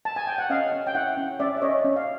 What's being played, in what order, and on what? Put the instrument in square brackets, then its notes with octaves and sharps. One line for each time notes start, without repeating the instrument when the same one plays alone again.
[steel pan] A5
G#5
G5
F#5
C#4 D#5 F5
C#4
G5
E4 E5 F#5
C#4
C#4 D5 E5
E5
C#4 C#5 D#5
C#4
F5